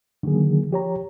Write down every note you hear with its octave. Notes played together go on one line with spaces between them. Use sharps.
D3 D#3 F#3 A#3 G#4
F3 G4 C#5 A#5